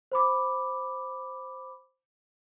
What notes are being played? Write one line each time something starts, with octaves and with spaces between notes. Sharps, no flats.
C5 B5 D6